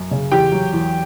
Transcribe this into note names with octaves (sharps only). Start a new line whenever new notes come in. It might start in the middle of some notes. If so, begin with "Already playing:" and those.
Already playing: F#2
C#3
E2 G4 G5
F#3
E2